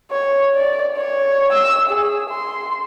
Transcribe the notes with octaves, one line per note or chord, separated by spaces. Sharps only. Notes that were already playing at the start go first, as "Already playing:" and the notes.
C#5
D5
C#5
E6
G#4
C6